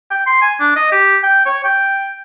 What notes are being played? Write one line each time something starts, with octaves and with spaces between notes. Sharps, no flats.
G5
C6
G#5
D4
D#5
G4
G5
C#5
G5